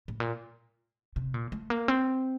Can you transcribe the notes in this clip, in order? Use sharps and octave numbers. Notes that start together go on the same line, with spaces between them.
A2
A#2
C3
A#2
A3
A#3
C4